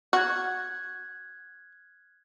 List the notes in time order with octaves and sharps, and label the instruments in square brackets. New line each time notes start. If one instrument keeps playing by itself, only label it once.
[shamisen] F#4 [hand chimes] F6 F#6 G#6